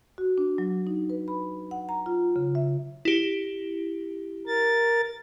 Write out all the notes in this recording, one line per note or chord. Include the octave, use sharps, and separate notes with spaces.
F#4
D4
F#3
D#4
B4
B5
F#5
A#5
F4
C#3
E5
E4 G4
A#4 A6